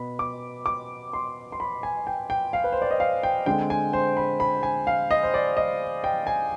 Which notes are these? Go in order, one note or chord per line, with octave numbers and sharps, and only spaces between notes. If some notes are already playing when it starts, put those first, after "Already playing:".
Already playing: B2 B3 B5
D6
D6
C6
C6
B5
G#5
G5
G5
F5
B4
C5
D5
D#5
F5
G5
D3 G#3 C4 G5
G#5
C5
B5
B5
G#5
F5
D#5
C5
D5
D#5
G5
G#5